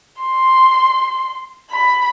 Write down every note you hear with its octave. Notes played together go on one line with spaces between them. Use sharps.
C6
B5